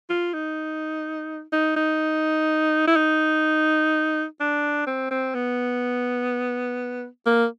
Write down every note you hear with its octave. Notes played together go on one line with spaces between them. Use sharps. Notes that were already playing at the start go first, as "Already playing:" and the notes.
F4
D#4
D#4
D#4
E4
D#4
D4
C4
C4
B3
A#3